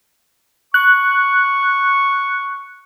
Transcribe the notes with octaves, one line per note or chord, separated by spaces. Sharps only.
C#6 F#6